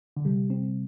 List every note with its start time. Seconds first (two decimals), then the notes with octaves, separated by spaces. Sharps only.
0.17 D3
0.25 C3 G3
0.50 C4